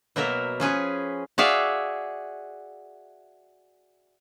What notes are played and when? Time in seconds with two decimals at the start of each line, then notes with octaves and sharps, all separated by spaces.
0.16 B2 F#3 A#3 A#4 E5
0.60 F3 C#4 G#4 B4
1.38 F#4 G#4 D5 E5 F5